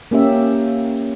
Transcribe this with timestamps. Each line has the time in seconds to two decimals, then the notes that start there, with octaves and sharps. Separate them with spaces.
0.11 A#3 C#4 G4 E5